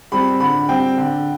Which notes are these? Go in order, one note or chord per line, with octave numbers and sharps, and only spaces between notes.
G3 C4 B5
D3 B5
G3 C4 G5
D3